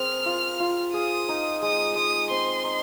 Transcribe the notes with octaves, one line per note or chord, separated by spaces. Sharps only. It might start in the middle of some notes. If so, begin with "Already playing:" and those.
Already playing: C4 G#4 A#4 F6
F4
F4
G#4 D#6
D#4
G#3 D#6
G#3 D#6
C4 C6
D#4